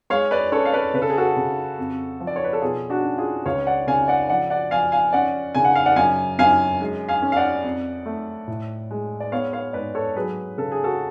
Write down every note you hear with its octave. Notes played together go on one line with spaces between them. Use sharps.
G#3 C#5 F5
B4 D5
C#4 A4 C#5
F5
B4 D5
C#3 B4
A4
G#4
F#4 A4
C#3
F2
F3
D5
C#5
B4
A4
B2 F4 G#4
D4 F#4
C#4
F4 G#4
C#2 C#5 F5
D5 F#5
C#3 F5 G#5
D5 F#5
F3 D5 F#5
D5 F#5
F3 F5 G#5
F5 G#5
C#4 D5 F#5
C#3 G#5
F#5
F5
D5 F#5
F#2 F5 G#5
F#2 F5 G#5
G#3
F5 G#5
C#4
F5
D5 F#5
F2
A3
A2
G#3
D5
B3 C#5 F5
C#5 F5
G#2 B4 D5
A4 C#5
F#3 G#4 B4
C#3 A4
G#4
F#4 A4